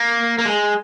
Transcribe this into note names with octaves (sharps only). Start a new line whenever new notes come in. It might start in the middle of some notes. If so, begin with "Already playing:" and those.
Already playing: A#3
A#3
G#3